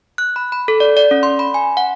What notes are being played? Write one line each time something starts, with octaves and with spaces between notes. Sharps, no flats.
F#6
B5
B5
A4
D5
D5
C#4
C6
B5
G#5
F#5